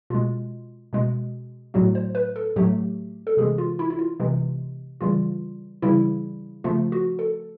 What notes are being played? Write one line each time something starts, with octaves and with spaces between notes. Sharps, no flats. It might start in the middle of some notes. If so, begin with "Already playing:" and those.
B2 G#3 F4
B2 G#3
A2 F#3 A3 F#4
C5
B4
A4
A2 F#3 A3 G4
A4
C3 E3 G#3 G#4
F4
E4
E4
F4
C3 E3 G#3
C#3 E3 G3 F4
C#3 E3 G3 E4
C#3 F3 A3 F4
F#4
A4